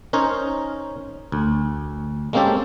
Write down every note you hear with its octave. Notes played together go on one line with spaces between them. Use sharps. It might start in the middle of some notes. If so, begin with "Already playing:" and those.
C#4 D#4 A#4 C5 C#5
D2
G#3 A#3 C4 C#4 G4 A4